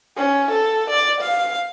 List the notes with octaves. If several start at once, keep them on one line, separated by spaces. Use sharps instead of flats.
C#4
A4
D5
F5